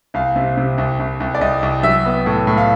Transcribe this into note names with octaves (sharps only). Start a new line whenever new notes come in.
C2 F5
C3
C3
C2
C2
C2
D5
C2 D#5
C2
F#3 E5
B3
A2
A2
F5